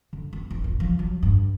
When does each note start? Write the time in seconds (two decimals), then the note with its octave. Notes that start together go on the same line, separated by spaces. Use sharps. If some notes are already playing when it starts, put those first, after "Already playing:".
0.13 D3
0.33 B3
0.50 F1
0.64 A#2
0.80 F3
0.99 F#3
1.23 G2